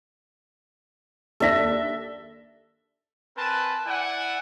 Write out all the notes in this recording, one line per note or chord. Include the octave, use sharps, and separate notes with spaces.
D#2 D4 A4 E5 A#6
C4 A#4 B4 G#5 A5
E4 D5 F#5 G#5